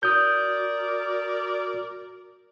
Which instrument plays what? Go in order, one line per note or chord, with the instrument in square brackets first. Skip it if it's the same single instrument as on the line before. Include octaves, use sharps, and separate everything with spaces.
[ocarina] F#4 [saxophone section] A#4 D5 [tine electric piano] D#6 G6